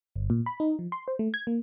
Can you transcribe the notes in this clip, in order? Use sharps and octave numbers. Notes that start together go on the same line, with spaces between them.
G1
A#2
B5
D#4
F3
C6
C5
A3
G#6
A#3